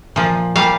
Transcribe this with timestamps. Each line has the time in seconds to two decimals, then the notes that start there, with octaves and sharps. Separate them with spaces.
0.16 A#2 F3
0.56 A#2 G3 F5